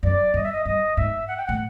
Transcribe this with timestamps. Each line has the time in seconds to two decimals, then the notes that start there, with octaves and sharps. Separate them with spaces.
0.03 F#2 D5
0.34 G2 D#5
0.43 E5
0.52 D#5
0.65 G2 D#5
0.96 G#2 E5
1.27 F#5
1.37 G5
1.45 A2 F#5